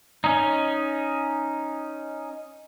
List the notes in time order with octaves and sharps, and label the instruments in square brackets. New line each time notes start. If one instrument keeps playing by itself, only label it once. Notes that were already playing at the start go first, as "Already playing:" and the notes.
[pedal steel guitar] C#4 D#4